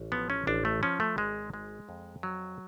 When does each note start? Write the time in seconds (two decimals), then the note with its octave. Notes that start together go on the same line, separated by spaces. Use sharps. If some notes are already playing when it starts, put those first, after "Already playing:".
Already playing: A1
0.12 F3 B3
0.30 C#4
0.47 A1 D4
0.65 A3
0.83 F3 C#4
1.00 A3
1.17 G#1 G#3
1.54 G#3
1.89 F2
2.23 F#3